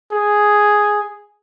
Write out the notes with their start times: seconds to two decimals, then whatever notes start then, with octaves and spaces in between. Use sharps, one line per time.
0.12 G#4